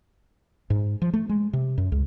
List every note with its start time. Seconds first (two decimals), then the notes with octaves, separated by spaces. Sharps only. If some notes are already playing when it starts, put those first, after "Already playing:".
0.70 G#2
1.02 F3
1.13 A3
1.29 G#3
1.53 C3
1.78 F#2
1.92 C#2